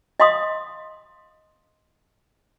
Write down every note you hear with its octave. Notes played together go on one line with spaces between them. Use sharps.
D#5 F5 C6 D#6